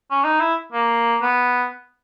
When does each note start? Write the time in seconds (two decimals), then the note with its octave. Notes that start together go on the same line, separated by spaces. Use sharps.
0.11 C#4
0.24 D#4
0.40 E4
0.73 A#3
1.22 B3